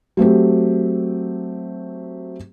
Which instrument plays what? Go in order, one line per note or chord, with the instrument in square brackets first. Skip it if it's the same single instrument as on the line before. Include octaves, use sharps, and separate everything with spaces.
[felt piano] F#3 A3 C4 G4